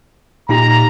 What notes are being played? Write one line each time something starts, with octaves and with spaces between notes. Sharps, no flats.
A#2 D#4 G4 A#5